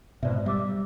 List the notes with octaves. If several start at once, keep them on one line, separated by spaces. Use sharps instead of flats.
G#2 B2 C5 D5 E5
G3 E5 D6 E6